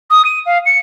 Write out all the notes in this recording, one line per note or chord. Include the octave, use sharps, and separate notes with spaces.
D#6
D#7
F5
C#7